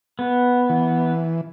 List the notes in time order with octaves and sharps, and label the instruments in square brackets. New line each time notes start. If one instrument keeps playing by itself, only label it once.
[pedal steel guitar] B3
[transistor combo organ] E3